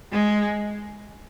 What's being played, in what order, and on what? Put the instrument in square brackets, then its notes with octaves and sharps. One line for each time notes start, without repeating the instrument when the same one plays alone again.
[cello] G#3